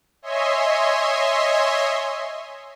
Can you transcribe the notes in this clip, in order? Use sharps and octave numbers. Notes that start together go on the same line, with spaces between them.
C#5 D#5 E5 G#5 C6